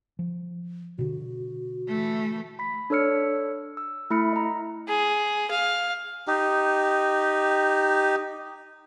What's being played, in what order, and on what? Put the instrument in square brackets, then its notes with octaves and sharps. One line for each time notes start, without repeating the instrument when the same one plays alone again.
[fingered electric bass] F3
[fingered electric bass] B2 D3 [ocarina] F#4
[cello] E3 A3
[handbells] B5 B6
D4 A4 C#5 E6 F6 C#7
E6
A3 E4 B5 F6 C#7
D#5 A#5
[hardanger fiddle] G#4
F5
[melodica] D#4 G4